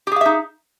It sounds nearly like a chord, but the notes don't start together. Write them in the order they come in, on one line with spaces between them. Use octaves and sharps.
G4 G#4 F5 E5 D#4